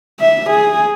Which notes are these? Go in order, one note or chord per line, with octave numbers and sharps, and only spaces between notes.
E5
G#4